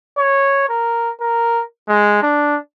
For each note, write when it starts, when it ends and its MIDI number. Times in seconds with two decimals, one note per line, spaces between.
0.18 0.64 73
0.69 1.10 70
1.21 1.63 70
1.88 2.18 56
2.22 2.58 62